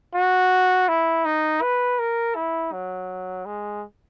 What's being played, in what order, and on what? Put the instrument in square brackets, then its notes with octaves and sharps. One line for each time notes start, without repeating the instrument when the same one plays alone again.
[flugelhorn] F#4
E4
D#4
B4
A#4
E4
F#3
G#3